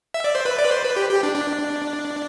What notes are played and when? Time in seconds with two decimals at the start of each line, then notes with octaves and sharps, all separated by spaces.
0.14 E5
0.24 D5
0.35 C5
0.45 B4
0.58 D5
0.65 B4
0.71 C5
0.84 B4
0.96 G4
1.10 G4
1.23 D4
1.35 D4